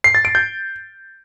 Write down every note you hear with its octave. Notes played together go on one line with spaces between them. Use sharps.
C7
A6
D7
G6